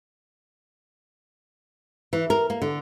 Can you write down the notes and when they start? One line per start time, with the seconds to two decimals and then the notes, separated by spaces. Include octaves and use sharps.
2.13 E3
2.30 A#4
2.50 A#3
2.62 D3